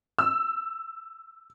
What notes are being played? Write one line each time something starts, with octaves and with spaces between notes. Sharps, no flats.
E6